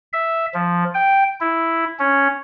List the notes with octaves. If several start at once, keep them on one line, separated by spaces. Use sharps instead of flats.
E5
F3
G5
E4
C#4